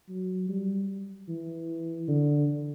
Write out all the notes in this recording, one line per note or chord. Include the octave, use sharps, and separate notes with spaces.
F#3
G3
E3
D3